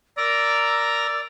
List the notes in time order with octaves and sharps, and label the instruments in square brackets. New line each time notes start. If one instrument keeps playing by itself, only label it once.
[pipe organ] A#4 A#5 [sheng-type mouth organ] D5 [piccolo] E6